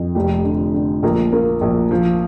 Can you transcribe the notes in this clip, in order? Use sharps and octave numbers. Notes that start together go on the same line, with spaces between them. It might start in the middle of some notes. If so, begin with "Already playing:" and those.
Already playing: F2
F1 G4
D3
D3
A#1 A#4
A#3
A#1
F3